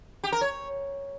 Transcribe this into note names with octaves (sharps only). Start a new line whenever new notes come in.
G4
A#4
C#5